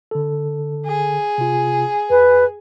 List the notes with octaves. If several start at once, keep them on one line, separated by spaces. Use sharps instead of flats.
D3 A4
G#4
C3 F4
F2 B4